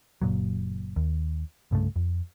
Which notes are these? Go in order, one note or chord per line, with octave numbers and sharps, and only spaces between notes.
F#1 A#2 F#3
D#2
C2 G2 C#3 A3
F2